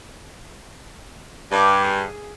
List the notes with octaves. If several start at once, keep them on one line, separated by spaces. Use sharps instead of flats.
G2 D#5 C#6 D6
G#4